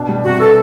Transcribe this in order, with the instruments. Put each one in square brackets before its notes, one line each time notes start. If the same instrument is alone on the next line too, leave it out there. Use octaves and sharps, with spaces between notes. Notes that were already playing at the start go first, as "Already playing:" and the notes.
Already playing: [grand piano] B2 D4
G3
[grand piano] C3 [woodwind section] F#4
[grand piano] B3 [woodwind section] A4